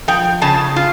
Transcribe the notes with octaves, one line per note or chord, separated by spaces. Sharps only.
F3 G5
C#3 A5
F4